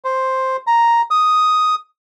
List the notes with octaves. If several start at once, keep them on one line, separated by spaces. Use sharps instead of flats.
C5
A#5
D#6